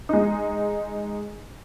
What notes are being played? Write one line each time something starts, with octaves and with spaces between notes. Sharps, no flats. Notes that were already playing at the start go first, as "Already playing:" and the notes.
G#3 D#4